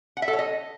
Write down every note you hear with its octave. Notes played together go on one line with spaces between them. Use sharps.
F#5
E5
A4
C#5
D#5